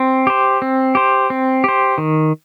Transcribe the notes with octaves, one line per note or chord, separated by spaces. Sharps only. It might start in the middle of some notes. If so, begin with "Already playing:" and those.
Already playing: C4
G4 C5
C4
G4 C5
C4
G4 C5
D#3